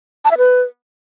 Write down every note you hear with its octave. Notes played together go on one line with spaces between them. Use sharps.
A5
E5
B4